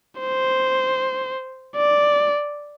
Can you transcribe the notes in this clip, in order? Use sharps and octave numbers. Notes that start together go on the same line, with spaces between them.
C5
D5